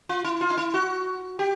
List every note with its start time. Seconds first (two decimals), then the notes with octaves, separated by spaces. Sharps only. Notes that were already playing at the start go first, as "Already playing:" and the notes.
0.09 F4
0.24 E4
0.41 F4
0.50 D#4
0.57 E4
0.74 F#4
1.39 G4